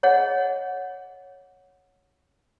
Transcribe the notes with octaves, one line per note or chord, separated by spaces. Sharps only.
G#4 C#5 D#5 F#5